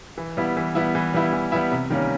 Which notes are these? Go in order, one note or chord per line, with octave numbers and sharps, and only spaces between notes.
E3
G3 B3 E4
E3
G3 B3 E4
E3
G3 B3 E4
E3
G3 B3 E4
C3
D#3 G3 A#3 C#4